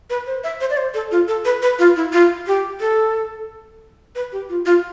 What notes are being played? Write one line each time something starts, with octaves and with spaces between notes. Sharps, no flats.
B4
C5
E5
C5
D5
C5
A4
F4
A4
B4
B4
F4
E4
F4
G4
A4
B4
G4
F4
F4